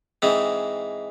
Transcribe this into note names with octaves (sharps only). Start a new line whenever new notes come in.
G#2 E3 G#3 C4